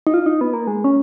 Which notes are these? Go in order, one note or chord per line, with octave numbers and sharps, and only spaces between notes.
D#4
F4
D#4
B3
A#3
G#3
C#4